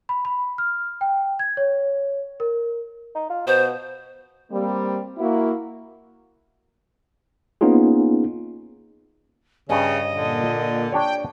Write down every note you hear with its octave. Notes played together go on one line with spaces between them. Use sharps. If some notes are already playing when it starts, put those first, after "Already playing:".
B5
B5
F6
G5
G#6
C#5
A#4
D#4
F4
B2 C5
G3 A#3 C4
A#3 E4 F#4
A#3 B3 C#4 D#4 F4 G#4
G2 C#3 C#4 D#5
A#2 D3
D4 G4 C#5 G5